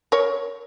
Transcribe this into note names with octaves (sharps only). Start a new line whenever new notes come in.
A#4 C#5